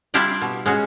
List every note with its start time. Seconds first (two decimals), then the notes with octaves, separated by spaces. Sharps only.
0.14 G3 D4 E4 F4 G4 D5
0.41 B2
0.66 G#3 C#4 F#4